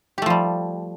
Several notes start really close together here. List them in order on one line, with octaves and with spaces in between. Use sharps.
G4 A3 F3 G3